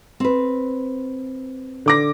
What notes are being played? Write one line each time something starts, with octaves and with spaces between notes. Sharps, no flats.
C4 B4
D3 D6 A#6